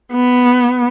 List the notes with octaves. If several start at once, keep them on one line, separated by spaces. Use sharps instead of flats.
B3